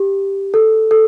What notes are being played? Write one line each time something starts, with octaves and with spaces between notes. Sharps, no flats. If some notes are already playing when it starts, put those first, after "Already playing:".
Already playing: G4
A4
A4